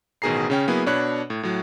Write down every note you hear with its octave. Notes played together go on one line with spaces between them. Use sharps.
A1 B2 D#3 G#4 A#5 C7
C#3 C#4 G5
F#3 A#3 B3 E4 G#4
B2 D4 C#5 B5 F#6
A2
A2 F#3